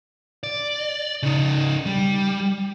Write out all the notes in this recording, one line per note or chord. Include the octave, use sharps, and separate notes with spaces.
D5
C#3 D#4
G3